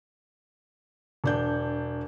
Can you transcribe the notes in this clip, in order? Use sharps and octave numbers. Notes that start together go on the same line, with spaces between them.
E1 D4 G6